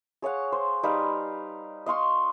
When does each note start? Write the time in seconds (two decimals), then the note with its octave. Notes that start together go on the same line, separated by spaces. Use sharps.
0.22 G#4 C#5 F5 F#5
0.52 C5
0.83 G3 D#4 B4 F5
1.86 D#5 F5 C6 C#6